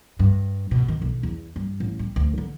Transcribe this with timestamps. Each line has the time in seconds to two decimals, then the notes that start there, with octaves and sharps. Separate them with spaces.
0.19 G2
0.71 B2
0.88 D#3
1.01 B1
1.23 E2
1.56 G2
1.80 A1
1.99 G3
2.16 D2
2.38 D3